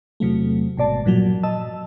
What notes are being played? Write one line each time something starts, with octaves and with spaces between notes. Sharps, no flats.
E2 C3 F#3 A3
G#1 B2 D5 A5
G2 A#2 F3 F#3
D#5 A5 E6